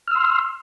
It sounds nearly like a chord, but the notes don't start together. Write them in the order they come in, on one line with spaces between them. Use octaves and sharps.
F6 E6 C6